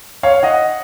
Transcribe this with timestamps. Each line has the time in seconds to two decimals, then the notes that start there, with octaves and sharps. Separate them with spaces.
0.23 C#5 F5
0.43 D#5 F#5